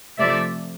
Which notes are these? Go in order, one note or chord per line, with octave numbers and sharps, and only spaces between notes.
C3 F3 A3 D5 E5